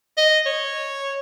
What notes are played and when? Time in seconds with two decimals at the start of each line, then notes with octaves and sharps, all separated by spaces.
0.18 D#5
0.46 C#5